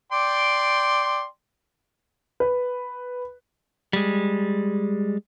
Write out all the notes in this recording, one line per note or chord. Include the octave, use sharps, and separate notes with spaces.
D5 G5 C6
B4
G3 G#3